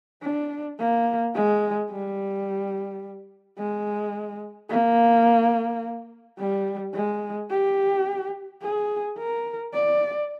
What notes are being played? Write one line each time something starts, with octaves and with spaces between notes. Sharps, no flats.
D4
A#3
G#3
G3
G#3
A#3
G3
G#3
G4
G#4
A#4
D5